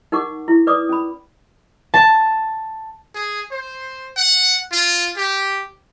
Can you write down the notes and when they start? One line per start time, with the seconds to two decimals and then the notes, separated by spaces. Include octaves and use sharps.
0.12 D#4 A#4 F#5 C#6 D6
0.48 E4
0.67 B4 D5 D6 D#6
0.89 C#4 B5
1.94 A5
3.15 G#4
3.51 C5
4.17 F#5
4.72 F4
5.17 G4